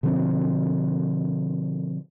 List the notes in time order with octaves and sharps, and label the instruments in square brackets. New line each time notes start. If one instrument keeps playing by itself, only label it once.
[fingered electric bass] B2 D3 F3 C4